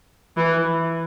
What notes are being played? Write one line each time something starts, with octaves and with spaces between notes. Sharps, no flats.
E3